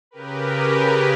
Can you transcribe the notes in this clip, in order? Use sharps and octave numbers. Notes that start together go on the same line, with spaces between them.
C#3 G4 A#4 B4